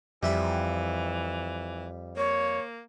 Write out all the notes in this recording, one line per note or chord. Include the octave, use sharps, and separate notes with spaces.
F2 E3 G3 E5 B5
A#3 C#5